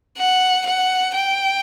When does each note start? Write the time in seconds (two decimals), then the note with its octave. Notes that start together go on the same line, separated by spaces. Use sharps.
0.18 F#5
0.66 F#5
1.16 G5